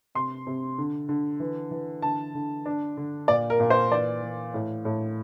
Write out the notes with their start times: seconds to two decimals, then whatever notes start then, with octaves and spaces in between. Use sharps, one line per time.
0.15 C3 C6
0.47 C3
0.78 D3
1.09 D3
1.40 E3
1.71 E3
2.02 D3 A5
2.35 D3
2.66 D4
2.97 D3
3.28 A#2 D5
3.50 A#4
3.60 A#2
3.70 C5
3.91 E3 D5
4.23 E3
4.54 A2
4.85 A2